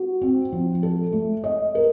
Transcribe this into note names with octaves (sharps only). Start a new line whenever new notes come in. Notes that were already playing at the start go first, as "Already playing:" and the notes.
Already playing: F#4
C4
F3
A4
A3
D#5
A#4